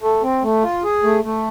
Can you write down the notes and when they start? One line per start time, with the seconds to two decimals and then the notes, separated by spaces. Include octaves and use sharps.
0.02 A3
0.23 C4
0.43 A3
0.63 F4
0.84 G#4
1.03 A3
1.24 A3